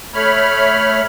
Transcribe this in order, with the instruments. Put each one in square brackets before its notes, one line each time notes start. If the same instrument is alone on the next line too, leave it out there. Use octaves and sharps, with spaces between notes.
[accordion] A3 C#5 B5 F6